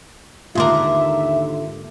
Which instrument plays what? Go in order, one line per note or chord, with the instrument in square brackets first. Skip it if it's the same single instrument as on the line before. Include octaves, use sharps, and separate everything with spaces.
[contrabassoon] D#2 [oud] G#2 D3 A#4 [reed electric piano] F4 C6 D6 [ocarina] E5